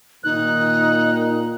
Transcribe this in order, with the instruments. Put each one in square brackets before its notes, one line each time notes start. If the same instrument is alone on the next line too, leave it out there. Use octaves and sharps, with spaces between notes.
[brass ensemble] A#2 D#3 [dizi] D#4 [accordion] F#6